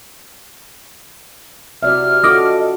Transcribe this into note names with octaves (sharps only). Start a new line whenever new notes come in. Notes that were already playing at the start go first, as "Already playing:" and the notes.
C3 F#4 D5 E5 F6
C#4 F4 F#4 A4 D#5 D6